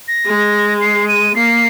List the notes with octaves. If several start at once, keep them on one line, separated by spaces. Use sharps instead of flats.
A#6
G#3
C7
D#7
A#3 C7